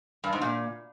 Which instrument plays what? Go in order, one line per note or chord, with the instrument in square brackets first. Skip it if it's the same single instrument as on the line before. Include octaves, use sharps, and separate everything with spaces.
[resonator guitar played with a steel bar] G2
G#2
A#2